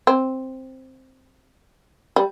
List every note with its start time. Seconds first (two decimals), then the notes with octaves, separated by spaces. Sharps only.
0.07 C4
2.16 G3